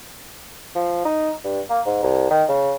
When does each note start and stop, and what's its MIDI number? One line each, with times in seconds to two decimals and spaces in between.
0.75 1.01 53
1.05 1.31 63
1.44 1.60 43
1.70 1.81 58
1.86 2.01 44
2.03 2.30 36
2.30 2.43 51
2.49 2.75 49